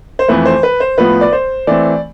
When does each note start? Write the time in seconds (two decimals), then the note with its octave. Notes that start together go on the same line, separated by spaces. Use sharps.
0.19 C5
0.28 F2 E3 A3 B4
0.46 C5
0.63 B4
0.80 C5
0.98 A2 F3 B3 B4
1.21 D5
1.33 C5
1.67 E3 A3 C4 D5